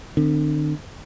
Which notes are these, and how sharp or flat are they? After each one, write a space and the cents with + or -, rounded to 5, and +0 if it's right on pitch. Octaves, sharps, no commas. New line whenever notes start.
D3 +45 C4 +0